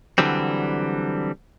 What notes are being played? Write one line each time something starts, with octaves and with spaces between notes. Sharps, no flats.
D3 E3 F#3 G3 C4